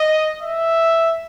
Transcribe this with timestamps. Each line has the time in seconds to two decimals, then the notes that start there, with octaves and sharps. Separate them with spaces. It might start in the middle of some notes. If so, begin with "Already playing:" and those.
Already playing: D#5
0.42 E5